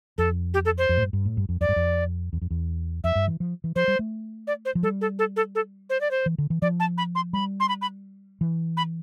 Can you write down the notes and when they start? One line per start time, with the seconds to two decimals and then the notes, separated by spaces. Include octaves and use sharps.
0.18 F2 A4
0.54 G4
0.65 A4
0.78 C5
0.89 F2
0.97 A2
1.02 G2
1.13 G2
1.25 A2
1.37 G2
1.49 F2
1.61 F2 D5
1.69 G2
1.76 F2
2.33 E2
2.42 F2
2.51 E2
3.04 F2 E5
3.15 G2
3.28 E3
3.40 F3
3.64 E3
3.76 F3 C5
3.88 G3
3.99 A3
4.47 D5
4.65 C5
4.75 F3
4.83 G3 A4
5.01 A4
5.19 A4
5.36 A4
5.55 A4
5.90 C5
6.01 D5
6.11 C5
6.26 E3
6.38 D3
6.50 E3
6.62 F3 D5
6.80 A5
6.98 B5
7.15 C6
7.33 G3 B5
7.60 C6
7.69 B5
7.82 B5
8.41 E3
8.77 B5